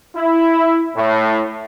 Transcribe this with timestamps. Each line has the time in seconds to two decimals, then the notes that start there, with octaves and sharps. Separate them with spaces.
0.16 E4
0.96 A2